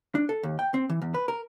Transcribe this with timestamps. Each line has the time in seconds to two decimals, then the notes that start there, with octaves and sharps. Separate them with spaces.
0.15 D4
0.29 A4
0.43 D#2
0.59 G5
0.74 C4
0.90 E3
1.02 E2
1.14 B4
1.28 A#4